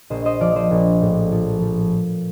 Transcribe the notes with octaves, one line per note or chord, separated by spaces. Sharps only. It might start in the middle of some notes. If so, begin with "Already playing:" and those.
A#1 C5 D#5
C5 D#5
F3 D5 F5
C5 D#5
A#1
A2
F3
F3